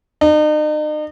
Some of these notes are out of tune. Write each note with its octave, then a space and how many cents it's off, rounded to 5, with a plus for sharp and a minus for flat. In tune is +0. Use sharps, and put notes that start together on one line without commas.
D#4 -40